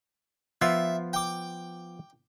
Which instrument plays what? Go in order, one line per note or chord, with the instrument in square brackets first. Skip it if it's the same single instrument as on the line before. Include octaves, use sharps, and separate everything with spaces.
[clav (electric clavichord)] F3 B3 F4 [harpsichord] E5
[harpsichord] G5 D6